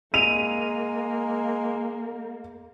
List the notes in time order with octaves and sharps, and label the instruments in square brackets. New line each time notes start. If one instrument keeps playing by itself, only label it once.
[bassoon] G#3 [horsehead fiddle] A#3 [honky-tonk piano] D#7 F7